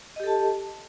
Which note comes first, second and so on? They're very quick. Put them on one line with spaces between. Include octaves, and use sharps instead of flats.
D#5 G4 A4 A5